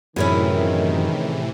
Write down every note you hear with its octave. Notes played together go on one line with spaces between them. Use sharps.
F#2 A2 C3 D#3 E3 C#4 E4 G#4